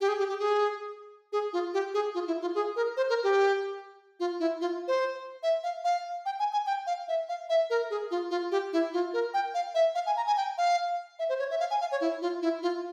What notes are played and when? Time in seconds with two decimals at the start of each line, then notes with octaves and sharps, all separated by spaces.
0.01 G4
0.08 G#4
0.19 G4
0.29 G4
0.40 G#4
1.32 G#4
1.53 F4
1.74 G4
1.94 G#4
2.15 F4
2.27 E4
2.42 F4
2.55 G#4
2.76 A#4
2.97 C5
3.10 A#4
3.23 G4
4.20 F4
4.40 E4
4.61 F4
4.88 C5
5.43 E5
5.63 F5
5.84 F5
6.26 G5
6.39 G#5
6.53 G#5
6.67 G5
6.87 F5
7.08 E5
7.29 F5
7.49 E5
7.70 A#4
7.90 G#4
8.11 F4
8.31 F4
8.51 G4
8.73 E4
8.93 F4
9.13 A#4
9.34 G5
9.54 F5
9.75 E5
9.95 F5
10.06 G#5
10.17 A#5
10.27 G#5
10.37 G5
10.58 F5
11.19 E5
11.29 C5
11.39 C#5
11.50 E5
11.60 F5
11.71 G#5
11.81 F5
11.92 C#5
12.01 E4
12.22 F4
12.42 E4
12.63 F4